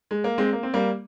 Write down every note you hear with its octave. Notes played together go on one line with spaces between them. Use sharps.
G#3
A#3
G#3 C4
A#3
C4
G3 A#3